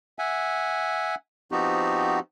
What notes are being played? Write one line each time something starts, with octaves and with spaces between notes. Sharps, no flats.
E5 F#5 G#5
F3 B3 C4 D#4 F#4 G4